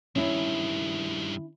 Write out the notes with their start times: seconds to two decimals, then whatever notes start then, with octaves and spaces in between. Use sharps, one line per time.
0.16 G2 D#3 C#4 E4